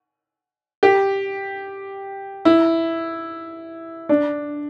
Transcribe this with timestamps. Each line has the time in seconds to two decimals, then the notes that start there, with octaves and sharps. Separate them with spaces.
0.83 G4
2.45 E4
4.09 D4